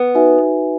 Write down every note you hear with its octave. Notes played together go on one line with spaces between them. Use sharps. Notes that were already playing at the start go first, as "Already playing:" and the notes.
Already playing: B3
D#4 F#4 B4 E5 G#5